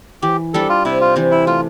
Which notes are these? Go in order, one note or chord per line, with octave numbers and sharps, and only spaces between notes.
E3 G4
G3 D4 A4
F4
C3 E4
F4
E3 G3 C4
E4
A3 F4